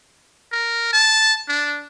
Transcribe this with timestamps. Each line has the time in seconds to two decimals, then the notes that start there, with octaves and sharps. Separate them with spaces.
0.52 A#4
0.93 A5
1.48 D4